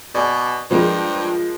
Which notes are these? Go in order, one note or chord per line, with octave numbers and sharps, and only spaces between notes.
B2 D5 G#5
G2 F3 G#3 A#4